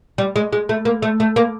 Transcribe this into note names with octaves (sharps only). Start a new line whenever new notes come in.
G3
G#3
G#3
A3
A#3
A3
A3
A#3